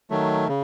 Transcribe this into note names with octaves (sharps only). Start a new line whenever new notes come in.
D#3 F#3 A3
C#3